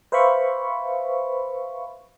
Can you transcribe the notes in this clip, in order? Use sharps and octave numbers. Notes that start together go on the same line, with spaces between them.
B4 C5 E5 F5 B5 C#6